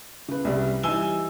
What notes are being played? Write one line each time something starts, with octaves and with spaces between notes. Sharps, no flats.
C#3 B4
C2 G3
E3 G3 D#4 G#5 E6 G7